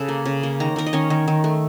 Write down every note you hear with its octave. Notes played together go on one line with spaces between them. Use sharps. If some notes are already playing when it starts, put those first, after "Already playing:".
Already playing: C#3 A4 A5
A#3
C#3
A#3
D#3 A#5
D#3 A#4 A#5
D#5
D#3 C#4 C#5
D#3
D#3
A3